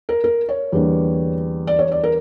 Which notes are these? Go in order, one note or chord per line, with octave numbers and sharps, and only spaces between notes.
A#4
A#4
C#5
E2 D3 G3 A#3
D5
C#5
D5
A#4